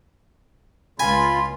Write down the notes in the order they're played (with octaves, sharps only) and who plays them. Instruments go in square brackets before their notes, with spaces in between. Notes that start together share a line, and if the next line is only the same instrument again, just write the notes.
[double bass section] C#2 [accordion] F4 [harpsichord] G#5 [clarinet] B5